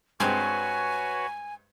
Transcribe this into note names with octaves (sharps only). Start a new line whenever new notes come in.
G2 G#3 C4 F#4 B4 C#5 G#5